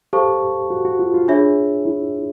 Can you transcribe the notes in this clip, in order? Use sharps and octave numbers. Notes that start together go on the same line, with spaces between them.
G4 A4 C5 F5 A5 C#6
F#4
F#4
F4
F4
D4 F4 G#4 C#5 E5
E4